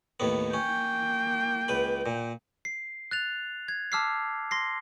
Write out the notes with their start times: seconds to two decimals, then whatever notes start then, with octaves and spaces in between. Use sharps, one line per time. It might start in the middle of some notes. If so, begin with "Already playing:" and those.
0.20 D#2 A2 B3
0.54 A#3 C#4 G5
1.68 C#2 B4 B5
2.06 A#2
2.65 C7
3.11 F#6 A6 F7
3.68 G#6
3.92 A5 D6 E6 F6 B6 C7
4.51 C6 A#6 C7